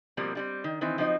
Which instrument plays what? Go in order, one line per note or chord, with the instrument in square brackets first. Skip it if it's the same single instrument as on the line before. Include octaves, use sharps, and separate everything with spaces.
[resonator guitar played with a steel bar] B2 F3 G3 A#3 C4
D3 G3 C4
D#3
D#3 E3 C4
F3 F#3 C4 D#4 D#5